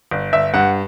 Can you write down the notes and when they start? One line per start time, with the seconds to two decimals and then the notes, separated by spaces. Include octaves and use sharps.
0.11 G1
0.33 G1 E5
0.54 G2 F#5